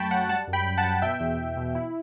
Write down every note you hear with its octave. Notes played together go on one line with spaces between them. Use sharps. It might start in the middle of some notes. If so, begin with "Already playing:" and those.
Already playing: F#2 F#3 A3 G5 A5 B5 C#6
F#3 F#5 A5
G3 F#5 A5
F#2
G5 B5
F#2
F#5 A5
F#2
B2 E5 G5
E2
E2
B2
E4